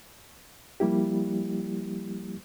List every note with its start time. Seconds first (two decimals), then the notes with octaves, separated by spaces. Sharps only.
0.80 F3 G3 A#3 E4 G4